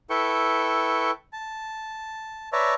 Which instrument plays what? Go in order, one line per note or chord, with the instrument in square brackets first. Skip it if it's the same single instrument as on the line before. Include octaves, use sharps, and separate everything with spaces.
[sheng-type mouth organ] E4 A4 B4 G5 C#6
A5
B4 C#5 D5 E5 A5 A#5